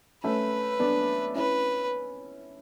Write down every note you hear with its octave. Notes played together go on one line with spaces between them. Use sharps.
A3 C#4 B4
B3 D4
C#4 E4 B4